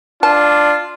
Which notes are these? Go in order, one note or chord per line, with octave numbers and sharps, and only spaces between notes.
D4 F4 A5